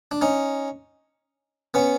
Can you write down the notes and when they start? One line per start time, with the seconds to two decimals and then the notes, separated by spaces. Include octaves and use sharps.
0.11 D4
0.21 C#4 D#4
1.74 B3 C#4